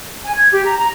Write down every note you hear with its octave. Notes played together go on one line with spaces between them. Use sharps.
G#5
G#6
G4
A#5
A#5